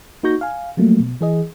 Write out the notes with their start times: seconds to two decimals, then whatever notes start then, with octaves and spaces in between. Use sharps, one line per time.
0.23 A#3 D#4 F#4 C#6 G6 A#6
0.41 F5 G#5
0.77 F3 F#3 A3 A#3
1.00 B2
1.21 E3 G#4 D#5